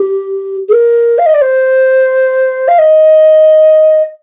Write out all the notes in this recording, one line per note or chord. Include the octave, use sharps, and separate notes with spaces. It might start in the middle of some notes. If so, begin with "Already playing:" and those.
Already playing: G4
G#4
A#4
F5
D#5
D5
C5
F5
D#5